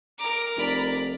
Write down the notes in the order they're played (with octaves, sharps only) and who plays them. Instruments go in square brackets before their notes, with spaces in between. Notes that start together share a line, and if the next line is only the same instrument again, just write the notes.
[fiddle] A#4 A#5 [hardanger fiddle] D6
[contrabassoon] F1 [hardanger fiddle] D5 B5